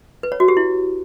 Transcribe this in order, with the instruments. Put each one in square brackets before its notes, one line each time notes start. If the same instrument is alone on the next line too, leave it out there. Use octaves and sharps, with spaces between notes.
[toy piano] B4
C#5
F#4
G4
E4